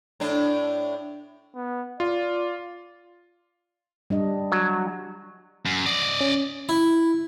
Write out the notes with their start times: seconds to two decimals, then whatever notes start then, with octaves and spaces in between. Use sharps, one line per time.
0.20 A2 D4
1.55 B3
2.00 F4 D5
4.10 G3 D4 D#5
4.52 F#3
5.66 F#2
5.86 D5 D#5
6.21 C#4
6.69 E4